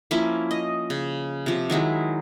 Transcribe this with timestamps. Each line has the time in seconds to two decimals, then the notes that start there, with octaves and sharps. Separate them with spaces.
0.11 F3 A#3 C#4 E4
0.51 D#5
0.90 C#3
1.46 C3 F3
1.70 D#3 F#3 G#3 E4